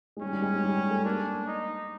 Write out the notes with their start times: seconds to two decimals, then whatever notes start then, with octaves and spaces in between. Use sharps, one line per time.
0.17 G#3
0.21 G3 C#4
0.33 G3
0.42 G#3
0.56 G#3
0.64 G3
0.77 G#3
0.91 A3
1.05 A#3 D4
1.47 D#4